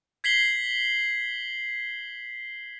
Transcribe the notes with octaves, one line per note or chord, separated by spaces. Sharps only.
G#6 B6 C7 F#7 G7